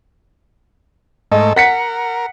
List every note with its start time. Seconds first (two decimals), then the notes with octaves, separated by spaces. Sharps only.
1.32 G#2 A3 A4 D#5
1.56 A#4 F#5 B6 C#7